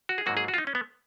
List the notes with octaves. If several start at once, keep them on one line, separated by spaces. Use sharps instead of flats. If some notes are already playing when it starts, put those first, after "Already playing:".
F#4
G#4
G#2 F#3 A#3 F#4
G#4
F#4
F4
D#4
C#4
B3